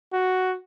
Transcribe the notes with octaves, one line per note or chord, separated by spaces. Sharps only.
F#4